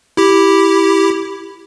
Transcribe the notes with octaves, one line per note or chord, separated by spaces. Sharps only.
E4 G4